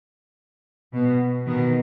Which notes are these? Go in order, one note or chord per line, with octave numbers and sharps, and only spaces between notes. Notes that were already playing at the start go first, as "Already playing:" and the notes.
B2
B2 D#3